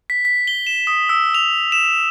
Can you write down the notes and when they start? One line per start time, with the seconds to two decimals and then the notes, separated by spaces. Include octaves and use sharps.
0.10 B6
0.25 B6
0.48 G7
0.67 E7
0.87 D#6
1.09 E6
1.34 F7
1.72 E7